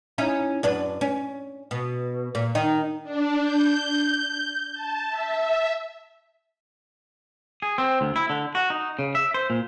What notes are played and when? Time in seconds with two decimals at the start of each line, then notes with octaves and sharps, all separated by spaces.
0.18 C#4 D#4 E4
0.63 F#2 D4 B4
1.01 C#4
1.71 B2
2.35 A#2
2.55 D#3 D#4
3.04 D4
3.43 G6
4.73 A5
5.09 E5
7.62 G#4
7.78 C4
8.01 D2
8.16 E4
8.30 D3
8.55 F#4
8.70 D#4
8.99 C#3
9.15 E5
9.34 C5
9.50 A#2